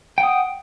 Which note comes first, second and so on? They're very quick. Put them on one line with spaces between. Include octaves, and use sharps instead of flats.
G5 F#5 D#6